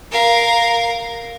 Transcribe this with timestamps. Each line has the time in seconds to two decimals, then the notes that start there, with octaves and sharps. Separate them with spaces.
0.12 A#4 F5